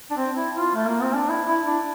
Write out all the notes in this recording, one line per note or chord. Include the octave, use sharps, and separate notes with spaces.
D4
C4
E4
F4
A3
A#3
C4
D4
E4
E4
D4